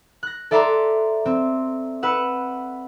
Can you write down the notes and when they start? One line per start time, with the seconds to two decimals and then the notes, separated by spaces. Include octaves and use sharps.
0.23 F#6 A#6
0.51 A4 D5 E5 A#5 C6 D6
1.26 C4
2.03 B4 F#5 E6